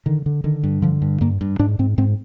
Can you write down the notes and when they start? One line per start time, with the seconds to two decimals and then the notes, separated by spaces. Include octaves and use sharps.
0.06 D3 D#3
0.26 D3
0.44 D3 D#3
0.63 G2
0.82 D3 F3
1.02 G2
1.21 G2 A#3
1.41 G2
1.59 G#2 D4
1.79 G#2 C4
1.98 G#2 C4